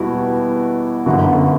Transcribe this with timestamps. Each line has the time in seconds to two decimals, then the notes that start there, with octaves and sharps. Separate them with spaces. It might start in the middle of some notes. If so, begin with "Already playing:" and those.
Already playing: E2 B2 G3 E4 F#4
1.06 G1 F#2 D3 F#4